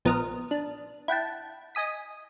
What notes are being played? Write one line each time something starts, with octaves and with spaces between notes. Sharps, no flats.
A#1 F3 B3 A#4 D#5 F6
D4
E4 F#5 G5 A5
D#5 G#5 D#6 B6